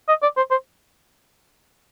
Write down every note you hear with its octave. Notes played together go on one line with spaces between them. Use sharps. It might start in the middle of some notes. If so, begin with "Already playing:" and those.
D#5
D5
C5
C5